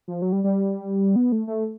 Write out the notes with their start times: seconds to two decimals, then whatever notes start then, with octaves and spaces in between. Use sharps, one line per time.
0.08 F3
0.22 F#3
0.32 G3
0.44 G3
1.16 B3
1.32 A3
1.47 A3